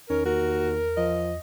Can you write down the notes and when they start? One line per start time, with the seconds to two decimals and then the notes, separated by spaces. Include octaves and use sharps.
0.10 E2 D#3 C#4 A#4
0.25 D#2 F#4 A#4
0.97 F3 D#5